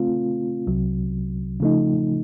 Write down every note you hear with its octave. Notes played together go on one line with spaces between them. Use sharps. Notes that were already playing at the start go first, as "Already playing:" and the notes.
Already playing: C#3 A3 C4 F4
C2 C3 F#3
C#3 F3 A3 D#4